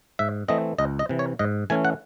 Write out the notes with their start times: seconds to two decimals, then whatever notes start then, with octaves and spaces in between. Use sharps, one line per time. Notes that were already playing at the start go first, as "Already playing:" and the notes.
0.19 G#2 E5
0.48 E3 A3 C4 D#5
0.79 C#2 D#5
0.99 D#5
1.09 C3 E3
1.19 C#5
1.39 G#2 D#5
1.70 E3 A3 C#4 G#5
1.85 F#5